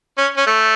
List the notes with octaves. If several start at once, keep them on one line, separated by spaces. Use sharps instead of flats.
C#4
C#4
A3